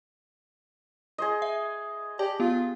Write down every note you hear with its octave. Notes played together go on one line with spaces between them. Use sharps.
G#4 C5 D#5
E5
G4 D5 A5
B3 F4 G4